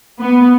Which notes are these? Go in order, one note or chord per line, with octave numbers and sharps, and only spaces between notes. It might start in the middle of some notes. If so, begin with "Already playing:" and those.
B3